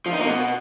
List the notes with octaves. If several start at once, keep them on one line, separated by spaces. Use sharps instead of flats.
F3
D#4
A#3
B2